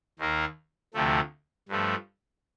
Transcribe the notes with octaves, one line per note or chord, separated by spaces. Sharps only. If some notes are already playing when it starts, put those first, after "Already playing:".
D#2 D#3 A#3
D2 C3 F3 A3
G2 F3 A3